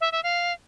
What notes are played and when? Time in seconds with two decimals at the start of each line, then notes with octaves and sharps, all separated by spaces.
0.01 E5
0.12 E5
0.23 F5